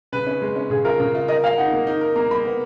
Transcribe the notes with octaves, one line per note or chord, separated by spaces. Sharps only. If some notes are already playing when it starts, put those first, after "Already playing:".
C#3 B4
C#4
G#3
C#4
C#3 G#4
F4 A#4
C#3 A#4
F4
A#4 D#5
A#4 F5
D#4 F#5
A#3
D#4
A#4
A#3 A#5
A#3 B5
B3